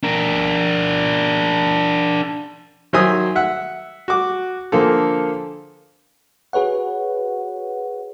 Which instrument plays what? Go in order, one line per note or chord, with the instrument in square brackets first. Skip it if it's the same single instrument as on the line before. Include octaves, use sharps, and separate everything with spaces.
[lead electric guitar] D4 A#4
[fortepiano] D#3 F#3 C5 E5 G#5 D#6
E5 F#5
F#4 D6
D3 F3 A#3 G#4 A4
[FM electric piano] F#4 G#4 B4 C#5 F#5